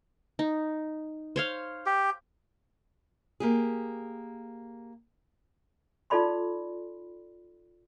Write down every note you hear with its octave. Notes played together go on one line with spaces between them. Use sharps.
D#4
C5 C#5 F5
G4
A#3 G4 G#4
D#4 F4 A4 D5 B5 C6